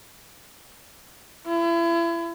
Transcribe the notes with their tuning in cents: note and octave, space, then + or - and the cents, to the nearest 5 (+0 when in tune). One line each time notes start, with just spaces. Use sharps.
E4 +35